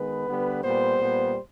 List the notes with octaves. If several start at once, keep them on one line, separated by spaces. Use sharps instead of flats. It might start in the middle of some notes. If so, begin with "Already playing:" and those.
Already playing: D#3 G#3 B3 B4
D3 G3 B3
A#2 G3 B3 C5
A#2 G3 B3